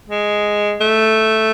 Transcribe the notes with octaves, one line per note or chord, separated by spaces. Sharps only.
G#3
A3